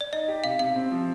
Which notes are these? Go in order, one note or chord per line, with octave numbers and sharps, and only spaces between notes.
D5
D#4 D#5
G4
C3 F5
C3 F5
C4
F3